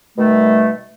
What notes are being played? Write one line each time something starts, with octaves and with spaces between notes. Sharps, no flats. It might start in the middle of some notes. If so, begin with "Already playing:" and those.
B2 D#3 G3 A3